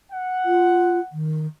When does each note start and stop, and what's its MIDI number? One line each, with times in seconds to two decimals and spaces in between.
0.12 1.12 78
0.45 1.00 65
1.12 1.46 51